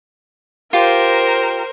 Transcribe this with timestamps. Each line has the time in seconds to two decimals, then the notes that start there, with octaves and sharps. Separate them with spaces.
0.73 F4 G4 A#4 C5